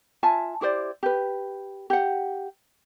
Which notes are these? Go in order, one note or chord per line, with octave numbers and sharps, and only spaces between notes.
F4 E5 G#5 A5
E4 G4 C5 D5
G4 B4
G4 F#5